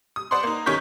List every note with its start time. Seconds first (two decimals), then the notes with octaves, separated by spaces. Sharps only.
0.16 D#6
0.31 C5 D5 F#5 B5 C6
0.43 A#3 D#4
0.66 G1 D#3 C#4 C#6 G6 B6